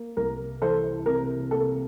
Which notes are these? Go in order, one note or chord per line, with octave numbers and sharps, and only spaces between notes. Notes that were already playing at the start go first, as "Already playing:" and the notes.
Already playing: A#3
C2 A#4
E3 A4 C5
C3 A#4
A#3 A4